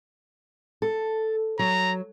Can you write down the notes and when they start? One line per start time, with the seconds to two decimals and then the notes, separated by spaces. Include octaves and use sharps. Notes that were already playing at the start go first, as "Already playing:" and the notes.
0.82 A4
1.59 F#3 A#5